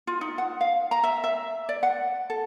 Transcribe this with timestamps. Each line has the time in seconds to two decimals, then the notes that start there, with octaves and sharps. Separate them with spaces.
0.07 F4
0.21 D#4
0.38 F#5
0.61 F5
0.91 A#5
1.04 E5
1.24 E5
1.69 D5
1.83 F#5
2.30 A4